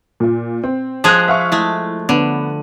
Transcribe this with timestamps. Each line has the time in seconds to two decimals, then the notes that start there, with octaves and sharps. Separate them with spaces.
0.20 A#2 F4
0.64 C4
1.04 F3 G#3 G#4 A5 F#6
1.28 E5 F5 C#6
1.52 G#3 A3 E4
2.09 D3 B3